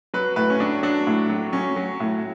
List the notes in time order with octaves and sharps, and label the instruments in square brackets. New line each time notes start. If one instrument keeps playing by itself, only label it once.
[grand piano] F#3 B4
A2 B4
C#4
F#3 D4
F#3 D4
A2
F#3
F#3 C#4
F#3
A2